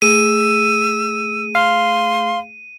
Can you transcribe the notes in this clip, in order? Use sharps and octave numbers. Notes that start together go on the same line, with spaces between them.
A3 G#4 E6 D#7
F5 C6